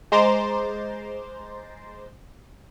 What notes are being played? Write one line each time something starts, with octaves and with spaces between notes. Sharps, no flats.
G#3 C5 A#5 C6 D6 A6